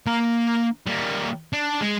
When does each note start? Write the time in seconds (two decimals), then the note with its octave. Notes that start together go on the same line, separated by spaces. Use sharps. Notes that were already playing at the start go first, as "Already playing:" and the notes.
0.06 A#3 A#5
0.87 G3 A#3
1.53 D4
1.81 G#3